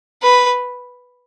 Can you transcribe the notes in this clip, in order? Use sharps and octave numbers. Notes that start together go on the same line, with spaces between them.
B4